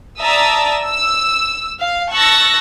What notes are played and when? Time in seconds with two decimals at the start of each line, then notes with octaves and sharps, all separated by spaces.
0.20 D5 E5 A5 A#5 D#6 E6
0.87 E6
1.81 F5
2.12 A5 C#6 E6 F#6 A6 A#6